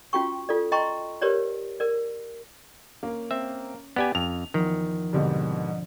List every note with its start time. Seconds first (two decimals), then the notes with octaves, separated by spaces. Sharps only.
0.13 C#4 F4 F#4 G5 C#6
0.49 F4 A4 D5
0.72 D#5 G5 A#5 C6 C#6
1.22 G4 A#4 B4 C#5 D5
1.80 A#4 D5
3.03 A#3 C#4
3.31 C4 E5
3.96 B3 G4 D5 G#5
4.15 F2 F7
4.54 E2 D#3 F3
5.13 G#2 B2 D3 G3 C4 D4